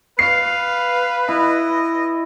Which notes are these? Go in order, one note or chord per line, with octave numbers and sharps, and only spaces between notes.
B4 F5 C7
E4 D#5